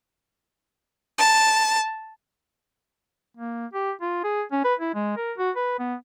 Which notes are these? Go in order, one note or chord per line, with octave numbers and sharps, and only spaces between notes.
A5
A#3
G4
F4
G#4
C#4
B4
E4
G#3
A#4
F#4
B4
B3